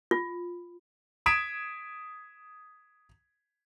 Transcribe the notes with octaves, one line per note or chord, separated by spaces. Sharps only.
F4
D#6 G#6 B6 D7 E7